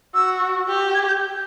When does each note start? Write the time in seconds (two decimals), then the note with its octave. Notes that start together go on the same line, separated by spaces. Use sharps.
0.15 F#4 E6
0.69 G4
0.94 G#6
1.08 G6